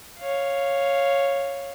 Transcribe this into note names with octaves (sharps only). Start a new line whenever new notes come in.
C#5 F5